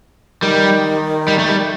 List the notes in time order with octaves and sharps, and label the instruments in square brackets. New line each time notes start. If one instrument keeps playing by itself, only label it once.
[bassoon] D#3 [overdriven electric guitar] G3
[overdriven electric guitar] G3
A3
G3